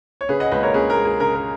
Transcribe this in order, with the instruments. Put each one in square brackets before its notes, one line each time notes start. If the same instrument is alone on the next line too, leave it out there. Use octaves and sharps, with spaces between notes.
[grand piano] C#5
C#3 G#4 B4
D#5 F#5
C#2 B4 D#5
A#4 C#5
C#4 G#4 B4
A#4
G#3
G#4
C#3 A#4
A#4